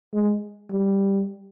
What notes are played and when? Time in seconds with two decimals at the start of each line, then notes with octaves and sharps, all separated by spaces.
0.14 G#3
0.71 G3